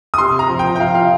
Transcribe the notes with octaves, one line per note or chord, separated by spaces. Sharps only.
D#6
C3 C6
A#5
F3
G5
G5
F3 F5
F5